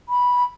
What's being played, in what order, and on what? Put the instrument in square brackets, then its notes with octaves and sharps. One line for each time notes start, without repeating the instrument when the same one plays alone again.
[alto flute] B5